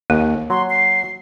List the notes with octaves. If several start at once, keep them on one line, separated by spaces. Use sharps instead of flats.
D#2 A#3
F#3 C6
C7